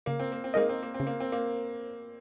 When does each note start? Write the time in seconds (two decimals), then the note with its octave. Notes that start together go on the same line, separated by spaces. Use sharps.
0.06 C#3 A#3
0.20 C4
0.32 A#3
0.44 C4
0.54 G#3 A#3 D#4 A#4 D#5
0.69 C4
0.82 A#3
0.94 C4
1.00 C#3
1.07 A#3
1.20 C4
1.32 A#3